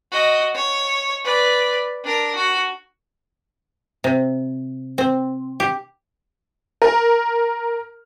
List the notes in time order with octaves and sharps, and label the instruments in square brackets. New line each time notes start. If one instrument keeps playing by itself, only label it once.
[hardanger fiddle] F#4 D#5
C#5
B4 D5
D4 A#4
F#4
[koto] C3
C4
G4
[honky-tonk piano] A#4